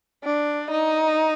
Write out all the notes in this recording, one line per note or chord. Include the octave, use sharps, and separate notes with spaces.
D4
D#4